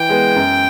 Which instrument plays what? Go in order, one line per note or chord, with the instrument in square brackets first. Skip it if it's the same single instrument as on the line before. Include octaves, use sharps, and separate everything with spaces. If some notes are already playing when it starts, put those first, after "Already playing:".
Already playing: [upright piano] E3 [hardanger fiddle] G5
[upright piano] G#3 B3
F#2